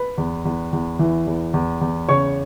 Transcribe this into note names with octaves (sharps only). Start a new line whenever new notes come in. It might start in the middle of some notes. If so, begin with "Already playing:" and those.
Already playing: B4 B5
E2
E2
E2
E3
E2
E2
E2
C#3 C#5 C#6